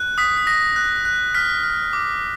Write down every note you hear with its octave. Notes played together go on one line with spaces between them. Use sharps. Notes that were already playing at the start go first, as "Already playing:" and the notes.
Already playing: F#6
D#6 B6
B6
D#6 A#6
F#6
F#6
F6 B6
F6
D6